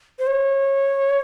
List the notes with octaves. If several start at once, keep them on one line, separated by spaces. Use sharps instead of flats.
C5
C#5